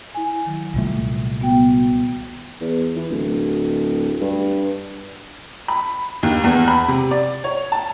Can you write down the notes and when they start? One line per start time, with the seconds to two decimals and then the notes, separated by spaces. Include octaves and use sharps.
0.15 E4 G#5
0.46 D#3 F#3
0.74 C2 A#2 G3 A3
1.41 B3 F#4 G5
2.61 E2
2.96 E3
3.10 D1
4.21 G2
5.68 B5
6.23 D#2
6.44 E2
6.68 B5
6.88 C3
7.11 D5
7.44 C#5
7.72 A5